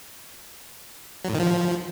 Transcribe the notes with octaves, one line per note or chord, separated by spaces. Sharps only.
F#3
A2
D#3
F3